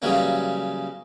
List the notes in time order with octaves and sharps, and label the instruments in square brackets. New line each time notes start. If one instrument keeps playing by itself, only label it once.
[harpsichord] C#3 E3 F#3 G3 A#3 C#4